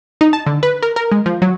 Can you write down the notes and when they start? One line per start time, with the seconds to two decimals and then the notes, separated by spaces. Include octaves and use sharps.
0.21 D#4
0.33 A5
0.46 D3
0.63 B4
0.83 A#4
0.96 A#4
1.12 G#3
1.26 F3
1.42 F#3